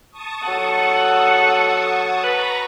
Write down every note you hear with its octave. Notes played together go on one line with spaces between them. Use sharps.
A5 C#6 D#6
F#3 A4 F#5
B4 A#5 B5 C#6